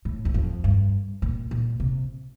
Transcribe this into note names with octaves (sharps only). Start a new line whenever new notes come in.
A2
E2
F2
G2
A#2
A#2
C3